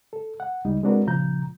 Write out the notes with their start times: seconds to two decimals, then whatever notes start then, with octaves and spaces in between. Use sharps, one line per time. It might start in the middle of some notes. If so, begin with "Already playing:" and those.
0.13 A4
0.40 F#5
0.65 C#2 G3 D#4
0.83 G#3 C4 D4 F#4 A#4 B4
1.07 A#2 C#3 F3 A#5 G6